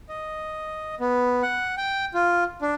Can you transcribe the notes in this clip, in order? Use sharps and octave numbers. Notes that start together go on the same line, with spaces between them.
D#5
B3
F#5
G5
F4
D4